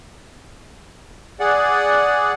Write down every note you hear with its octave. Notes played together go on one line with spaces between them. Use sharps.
G#4 D5 F#5